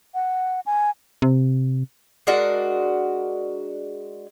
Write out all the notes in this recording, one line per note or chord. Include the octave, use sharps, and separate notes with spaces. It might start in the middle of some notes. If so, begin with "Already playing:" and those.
F#5
G#5
C3
G#3 D4 F#4 A#4